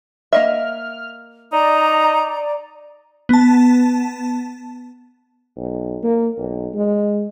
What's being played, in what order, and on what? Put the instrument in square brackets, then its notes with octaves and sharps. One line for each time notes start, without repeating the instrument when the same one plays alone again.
[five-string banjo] A#3 D#5 E5 [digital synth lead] F6
[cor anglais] D#4 [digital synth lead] D5 [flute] A#5
[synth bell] B3 A5
[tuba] B1
A#3
B1
G#3